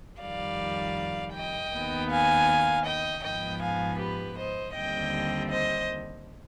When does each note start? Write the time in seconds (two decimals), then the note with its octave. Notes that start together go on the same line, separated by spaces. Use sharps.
0.21 F2 D#3 G3 D5 F5
1.35 D#5 G5
1.73 D#2 D#3 B3
2.11 F5 G#5
2.86 D#5 G5
3.23 G#2 F3 B3 D#5 G5
3.62 F5 G#5
3.99 G4 B4
4.38 C5 D#5
4.75 D#2 D3 G3 C4 D#5 G5
5.50 C5 D#5